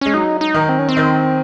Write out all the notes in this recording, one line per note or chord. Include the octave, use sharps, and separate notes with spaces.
G#3 C#4
F#3 D#4
D#4
D#3
C4
C#4
C4
D#3